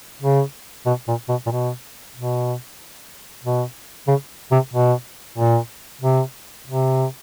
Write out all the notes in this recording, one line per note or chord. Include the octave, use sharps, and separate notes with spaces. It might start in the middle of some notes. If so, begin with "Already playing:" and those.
C#3
B2
A#2
B2
A#2
B2
B2
B2
C#3
C3
B2
A#2
C3
C3